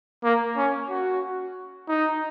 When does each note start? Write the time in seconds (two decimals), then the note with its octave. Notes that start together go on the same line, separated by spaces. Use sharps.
0.24 A#3
0.57 C#4
0.90 F#4
1.88 D#4